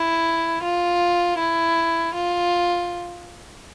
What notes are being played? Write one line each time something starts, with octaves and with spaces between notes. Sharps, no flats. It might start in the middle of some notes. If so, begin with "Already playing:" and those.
Already playing: E4
F4
E4
F4